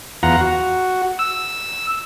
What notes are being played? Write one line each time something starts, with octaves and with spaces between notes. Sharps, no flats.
E2 F4 F#5 A#5
F#4
E6